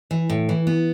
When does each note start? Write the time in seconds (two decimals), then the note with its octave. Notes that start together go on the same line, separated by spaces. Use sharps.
0.11 E3
0.30 A2
0.49 E3
0.67 B3